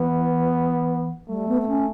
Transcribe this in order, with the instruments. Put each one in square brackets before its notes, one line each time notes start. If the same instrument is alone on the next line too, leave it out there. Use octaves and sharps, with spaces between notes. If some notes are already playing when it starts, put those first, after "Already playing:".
Already playing: [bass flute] E3 [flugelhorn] B3
[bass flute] G3 [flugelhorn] A3
[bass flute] B3
B3
C#4